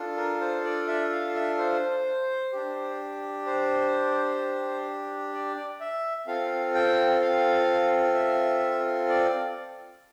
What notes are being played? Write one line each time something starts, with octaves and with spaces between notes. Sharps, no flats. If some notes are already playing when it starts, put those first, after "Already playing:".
Already playing: D4 F4 A4
A#4
C5
D5
E5
F5
E5
C5
D4 G4
C5
D5
E5
C4 F4 A4 F5
G5
F5
E5
D5